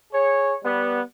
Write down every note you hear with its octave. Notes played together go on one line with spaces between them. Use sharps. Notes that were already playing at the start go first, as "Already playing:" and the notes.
G#4 C#5
G3 B3